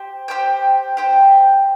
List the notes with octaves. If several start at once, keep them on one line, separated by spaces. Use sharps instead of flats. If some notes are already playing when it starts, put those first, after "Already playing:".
Already playing: G4 C5
G4 C5 G5
G4 C5 G5